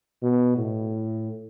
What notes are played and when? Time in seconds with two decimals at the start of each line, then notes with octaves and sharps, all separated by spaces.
0.23 B2
0.57 A2